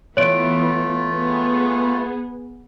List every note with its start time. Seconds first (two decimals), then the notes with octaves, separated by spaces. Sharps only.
0.17 E3 A3 B3 F4 C#5 D7
1.10 B3 G#4